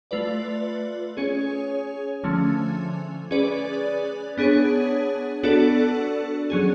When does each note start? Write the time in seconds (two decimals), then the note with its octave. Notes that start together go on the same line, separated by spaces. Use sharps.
0.11 A3 F4 B4 D5
1.17 C#4 G#4 C#5
2.24 D3 F3 A3 C#4
3.31 C#4 G#4 B4 D5
4.38 B3 D4 G#4 C#5
5.43 B3 D4 F#4 A4 D5
6.50 F#3 C#4 G#4